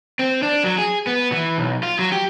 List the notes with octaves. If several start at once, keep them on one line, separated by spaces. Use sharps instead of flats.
C4
D4
F#3
G#4
B3
E3
B1
F4
F#3
G4